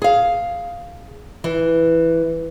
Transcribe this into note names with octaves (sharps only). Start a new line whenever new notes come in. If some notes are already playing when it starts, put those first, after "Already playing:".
G#4 F5
E3